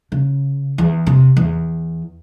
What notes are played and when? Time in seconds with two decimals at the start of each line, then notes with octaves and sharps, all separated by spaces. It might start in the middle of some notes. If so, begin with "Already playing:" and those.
0.12 C#3
0.78 E2
1.07 C3
1.37 E2